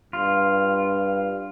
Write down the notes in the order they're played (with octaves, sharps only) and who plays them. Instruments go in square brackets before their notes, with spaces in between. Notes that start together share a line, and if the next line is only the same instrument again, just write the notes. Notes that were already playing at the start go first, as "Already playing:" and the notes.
[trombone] G2 [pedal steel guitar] F4